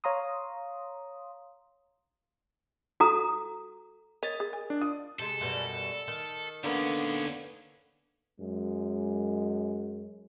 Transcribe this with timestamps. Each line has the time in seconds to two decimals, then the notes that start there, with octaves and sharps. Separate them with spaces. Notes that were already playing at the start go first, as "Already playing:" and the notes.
0.04 C#5 F5 A#5 C6 D#6
3.00 F#4 A4 A#5 D#6
4.23 A#4 C#5 D#5 A6
4.40 G#4
4.53 G#5
4.70 D4
4.82 F4 D#6
5.19 C3 G#3 A4
5.41 F#2 B2 G3
6.08 D#3
6.64 A2 D3 A#3 B3 C#4
8.39 F#2 G#3